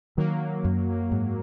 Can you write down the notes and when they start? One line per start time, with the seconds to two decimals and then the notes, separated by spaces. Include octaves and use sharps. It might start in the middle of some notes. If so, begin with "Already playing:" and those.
0.17 D#3 F#3 A#3
0.65 F#2
1.12 G#2